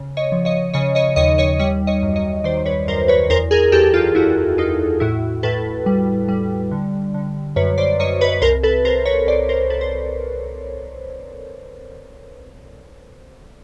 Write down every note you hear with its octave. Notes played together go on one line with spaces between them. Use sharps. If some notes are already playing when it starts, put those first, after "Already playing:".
Already playing: C#3
C#5 D#5
F3
C#5 D#5
C#3 C#5 D#5
C#5 D#5
D#2 C#5 D#5
C#5 D#5
G3 C#5 D#5
C#5 D#5
F#2
C#5 D#5
D#3 C5 D5
B4 C#5
F#2 A#4 C5
B4 C#5
E2 A#4 C5
G#4 A#4
E2 G4 A4
F4 G4
E2 E4 F#4
E2 D#4 F4
A2 E4 F#4
A2 A4 B4
G3
G3
D3
D3
F#2 B4 C#5
C5 D5
F#2 C#5 D#5
B4 C#5
C2 A#4 C5
A4 B4
C2 A#4 C5
B4 C#5
C2 C5 D5
A#4 C5
C2 A4 B4
C5